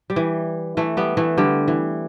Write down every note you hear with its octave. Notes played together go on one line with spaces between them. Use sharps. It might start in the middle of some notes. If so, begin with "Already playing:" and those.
G3
E3
E3 A3
G3 B3
E3 A3
D3 G3
E3